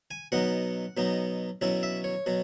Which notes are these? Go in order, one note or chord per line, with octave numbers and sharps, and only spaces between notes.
G#5
B2 F#3 B3 D#4 F#5
B2 F#3 B3 D#4
B2 F#3 C#4 E4
E5
C#5
B2 F#3